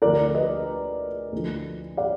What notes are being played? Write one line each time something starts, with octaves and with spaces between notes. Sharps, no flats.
D2 D3 F3 A#4 D5
B4 D#5
D2 D3 F3
D5 F5